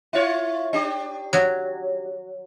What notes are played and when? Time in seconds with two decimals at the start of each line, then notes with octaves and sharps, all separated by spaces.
0.13 E4 F4 C#5
0.73 D4 G4
1.33 F#3